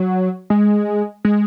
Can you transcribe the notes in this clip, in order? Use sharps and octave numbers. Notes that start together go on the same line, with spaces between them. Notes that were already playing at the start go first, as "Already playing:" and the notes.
Already playing: F#3
G#3
G#3